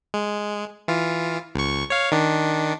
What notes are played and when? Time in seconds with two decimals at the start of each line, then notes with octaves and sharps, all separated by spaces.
0.14 G#3
0.88 E3 F4
1.55 C#2 C#6
1.90 C#5 F5
2.12 D#3 D4